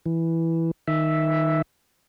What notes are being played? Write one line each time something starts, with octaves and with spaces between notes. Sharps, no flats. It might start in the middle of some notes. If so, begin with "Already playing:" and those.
E3
D#3 E5